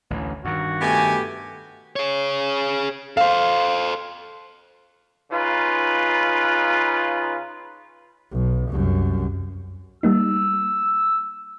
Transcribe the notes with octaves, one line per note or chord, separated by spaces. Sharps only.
A1 D2 E3
G2 D#3 F#4
B2 A3 G4 G#5
G#4 C#5
A4 C5 F5
C#3 D#4 F4 B4
B1
C2 F#2
G3 A#3 D#4 E6